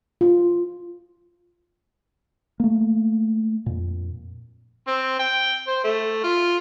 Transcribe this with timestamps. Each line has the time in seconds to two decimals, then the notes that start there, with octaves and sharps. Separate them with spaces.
0.21 F4
2.60 A3 A#3
3.66 F2 A#2
4.87 C4
5.19 G5
5.67 C5
5.84 A3
6.24 F4